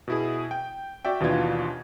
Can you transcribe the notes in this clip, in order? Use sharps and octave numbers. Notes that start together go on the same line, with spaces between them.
B2 E4 G#4
G5
F#4 D5 E5 G5
D#2 B2 E3 D4 F4 G#6